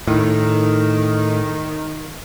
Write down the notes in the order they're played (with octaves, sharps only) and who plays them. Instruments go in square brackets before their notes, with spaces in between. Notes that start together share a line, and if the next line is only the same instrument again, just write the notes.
[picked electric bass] A2 [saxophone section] D#3